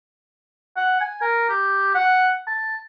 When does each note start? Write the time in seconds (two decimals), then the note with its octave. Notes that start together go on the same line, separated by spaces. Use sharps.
0.76 F#5
1.01 G#5
1.22 A#4
1.49 G4
1.95 F#5
2.47 A5